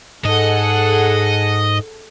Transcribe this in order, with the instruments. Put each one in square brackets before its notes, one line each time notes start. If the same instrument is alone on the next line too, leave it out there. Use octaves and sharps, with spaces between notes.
[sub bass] G#2 [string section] G#4 A4 F#5 [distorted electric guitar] D#5